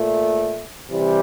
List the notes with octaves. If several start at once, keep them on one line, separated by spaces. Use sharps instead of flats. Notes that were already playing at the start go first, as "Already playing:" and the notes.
Already playing: A#2 A3
C3 E3 G3